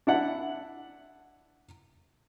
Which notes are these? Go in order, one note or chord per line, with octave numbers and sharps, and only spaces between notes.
D4 E4 F#5